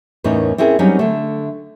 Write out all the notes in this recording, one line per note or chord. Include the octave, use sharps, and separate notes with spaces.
E2 A2 C#4 D#4 A#4
C4 C#4 E4 G#4 A#4
F#3 G3 C4 C#4 D#4
D3 A3